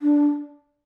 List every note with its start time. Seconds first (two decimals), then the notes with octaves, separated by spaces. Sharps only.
0.02 D4